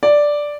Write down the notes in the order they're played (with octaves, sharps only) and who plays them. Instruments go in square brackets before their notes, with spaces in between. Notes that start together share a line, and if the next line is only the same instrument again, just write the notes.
[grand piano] D5